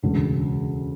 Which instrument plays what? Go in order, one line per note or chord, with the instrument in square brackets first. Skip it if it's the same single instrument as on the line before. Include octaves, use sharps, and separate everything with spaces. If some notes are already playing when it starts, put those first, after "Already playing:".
[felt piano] E1 D2 C#3